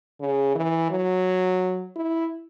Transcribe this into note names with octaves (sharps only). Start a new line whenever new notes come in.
C#3
E3
F#3
E4